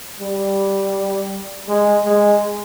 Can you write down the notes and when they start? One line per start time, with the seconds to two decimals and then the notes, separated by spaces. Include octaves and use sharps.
0.20 G3
1.68 G#3
2.05 G#3